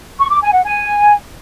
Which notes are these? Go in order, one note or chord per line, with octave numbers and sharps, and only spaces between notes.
C#6
D6
G#5
F#5
G#5